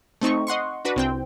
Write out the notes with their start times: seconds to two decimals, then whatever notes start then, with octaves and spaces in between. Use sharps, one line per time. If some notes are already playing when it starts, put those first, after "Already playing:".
0.21 A3 C4 D#4 C#6
0.47 D#5 F#5 C6 C#6
0.85 D4 F#4 B4
0.96 C2 C4 G5